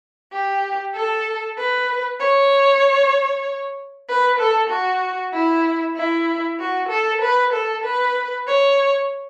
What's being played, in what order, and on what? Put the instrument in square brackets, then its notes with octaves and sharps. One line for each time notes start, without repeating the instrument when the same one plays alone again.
[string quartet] G4
A4
B4
C#5
B4
A4
F#4
E4
E4
F#4
A4
B4
A4
B4
C#5